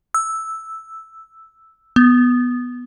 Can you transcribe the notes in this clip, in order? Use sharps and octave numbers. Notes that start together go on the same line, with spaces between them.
E6
B3